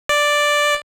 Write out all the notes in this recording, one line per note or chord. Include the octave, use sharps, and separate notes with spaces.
D5